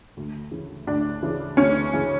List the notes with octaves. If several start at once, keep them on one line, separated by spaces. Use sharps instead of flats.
D2
C#3 E3
D2 D4
C#3 E3
D2 C#4
C#3 E3